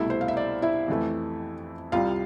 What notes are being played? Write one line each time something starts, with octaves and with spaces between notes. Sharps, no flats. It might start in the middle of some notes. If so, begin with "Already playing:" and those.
Already playing: C2 B2 A3 E4 E5
C5
F5
E5
D5
E4 E5
F2 E3 A3
C2 C3 G3 F4 F5